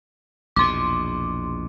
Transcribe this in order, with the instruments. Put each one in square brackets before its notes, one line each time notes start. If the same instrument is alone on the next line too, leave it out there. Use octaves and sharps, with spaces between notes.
[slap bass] A#1 E2 B2 [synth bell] C6 D6